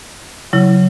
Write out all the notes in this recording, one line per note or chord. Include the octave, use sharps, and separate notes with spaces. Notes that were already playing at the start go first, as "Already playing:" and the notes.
C#3 F#3 E4